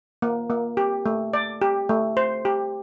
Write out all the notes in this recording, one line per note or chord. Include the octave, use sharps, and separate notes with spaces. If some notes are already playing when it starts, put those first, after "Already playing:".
A#3
A#3
G4
A3
D5
G4
A3
C5
G4